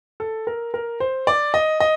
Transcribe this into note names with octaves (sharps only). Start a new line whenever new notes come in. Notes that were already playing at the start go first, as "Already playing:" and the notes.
A4
A#4
A#4
C5
D5
D#5
D#5